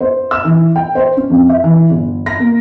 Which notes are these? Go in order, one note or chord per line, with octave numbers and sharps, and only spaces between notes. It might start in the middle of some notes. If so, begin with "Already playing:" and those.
C5
E6
E3
G5
C5
C#4
F2
E5
E3
G1
A#6
A#3